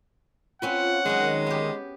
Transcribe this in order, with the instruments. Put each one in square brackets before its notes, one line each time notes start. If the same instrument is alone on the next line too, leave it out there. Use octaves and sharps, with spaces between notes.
[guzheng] C4 C#4 B4 [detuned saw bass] F4 [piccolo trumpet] F#5
[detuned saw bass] D#3 [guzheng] F#3 F#4 G#4 [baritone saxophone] G#3
[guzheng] B3 G4